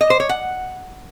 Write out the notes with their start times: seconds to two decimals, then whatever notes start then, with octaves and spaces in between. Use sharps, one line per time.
0.01 D#5
0.10 C5
0.20 C#5
0.29 F#5